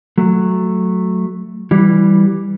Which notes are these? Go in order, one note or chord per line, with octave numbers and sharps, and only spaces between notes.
F#3 A3
E3 G3